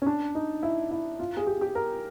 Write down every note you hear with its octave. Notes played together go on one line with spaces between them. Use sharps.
C#4
D4
D#4
E4
E4
F4
G#4
G4
G4
A#4